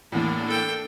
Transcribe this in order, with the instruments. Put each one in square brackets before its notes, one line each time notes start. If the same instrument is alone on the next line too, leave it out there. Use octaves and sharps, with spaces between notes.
[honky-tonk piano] E2 A2 [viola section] A#3 D4
[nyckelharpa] A4 G5